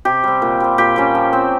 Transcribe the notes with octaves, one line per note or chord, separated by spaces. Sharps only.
C3 G4
G3 C4
A#2
G3 C4
A#2 G4
G3 A#3 C#4
F3
C4